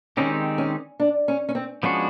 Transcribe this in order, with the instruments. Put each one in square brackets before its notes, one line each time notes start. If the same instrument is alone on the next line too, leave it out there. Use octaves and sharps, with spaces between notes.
[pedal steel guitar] D#3 G#3 C4 D#4 G4 [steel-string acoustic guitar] C#4
[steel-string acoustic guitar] C#4
D4
C#4
C#4
C4
[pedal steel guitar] F3 G#3 B3 D4 F#4 [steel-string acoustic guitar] C#4